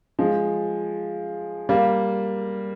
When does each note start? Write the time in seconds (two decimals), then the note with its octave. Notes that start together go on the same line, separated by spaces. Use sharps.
0.19 F3 G#3
1.69 G3 A#3